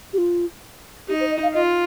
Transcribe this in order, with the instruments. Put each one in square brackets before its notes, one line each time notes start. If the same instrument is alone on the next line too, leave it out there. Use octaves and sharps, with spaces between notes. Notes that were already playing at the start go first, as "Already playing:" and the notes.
[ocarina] G4
F4
[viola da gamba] D#4 [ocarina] G4
[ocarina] C5
D#5
F5
[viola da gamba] F4 [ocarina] D#5